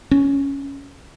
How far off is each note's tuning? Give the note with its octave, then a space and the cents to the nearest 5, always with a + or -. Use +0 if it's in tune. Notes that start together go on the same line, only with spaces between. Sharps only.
C#4 +5